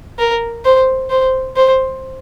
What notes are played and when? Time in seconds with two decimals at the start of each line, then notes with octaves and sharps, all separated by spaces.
0.19 A#4
0.65 C5
1.10 C5
1.56 C5